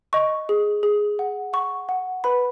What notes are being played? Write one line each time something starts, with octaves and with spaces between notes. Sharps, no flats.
D#5 C#6
G#4
G#4
F#5
F#5 C#6
F#5
B4 B5